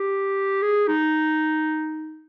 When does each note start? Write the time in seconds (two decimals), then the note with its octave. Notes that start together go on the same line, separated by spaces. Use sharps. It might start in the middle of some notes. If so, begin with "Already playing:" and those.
Already playing: G4
0.62 G#4
0.87 D#4